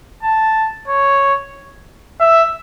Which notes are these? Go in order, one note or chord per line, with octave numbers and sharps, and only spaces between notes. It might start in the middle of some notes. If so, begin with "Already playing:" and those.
A5
C#5
E5